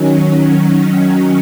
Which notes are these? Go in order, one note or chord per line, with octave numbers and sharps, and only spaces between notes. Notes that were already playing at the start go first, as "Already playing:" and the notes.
Already playing: D#3 F#3 C#4